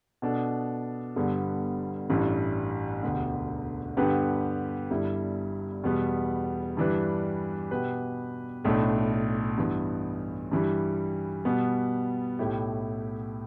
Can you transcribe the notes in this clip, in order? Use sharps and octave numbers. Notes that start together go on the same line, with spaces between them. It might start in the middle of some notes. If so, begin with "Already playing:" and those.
B2 B3 D4 A4
G1 G2 D3 G3 B3
A1 G2 E3 G3
E1 D2 D3 B3 G4
G2 D3 B3 G4 B4
G1 G2 G3 E4
E2 B2 G3 B3
G2 E3 G3 D4 B4
B2 B3 G4 B4
B1 A2 A3 D4
G2 E3 B3
G2 E3 G3
B2 G3 B3
B1 A2 A3 E4 G4